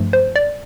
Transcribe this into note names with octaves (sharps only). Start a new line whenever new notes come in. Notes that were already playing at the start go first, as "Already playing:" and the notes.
Already playing: G2 F3 A3
C5
D5